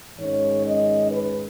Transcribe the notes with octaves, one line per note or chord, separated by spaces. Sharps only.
G#2 D#3 G#3 C#4 C#5
D#5
B4